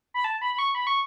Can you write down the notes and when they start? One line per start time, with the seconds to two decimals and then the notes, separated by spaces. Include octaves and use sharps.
0.14 B5
0.24 A5
0.41 B5
0.54 B5
0.59 C#6
0.75 B5
0.87 C#6